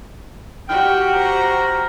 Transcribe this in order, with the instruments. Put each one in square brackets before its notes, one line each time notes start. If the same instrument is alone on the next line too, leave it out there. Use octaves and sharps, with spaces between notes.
[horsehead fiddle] F#4 G4 [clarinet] G5 [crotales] F6
[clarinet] C5 [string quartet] A#5